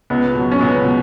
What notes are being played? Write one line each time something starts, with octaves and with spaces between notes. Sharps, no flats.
C#2 B3
B2 F#3
C#4
C#2 B3
B2